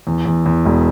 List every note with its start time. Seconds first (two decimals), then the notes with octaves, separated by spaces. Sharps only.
0.07 E2
0.26 E2
0.46 E2
0.66 E1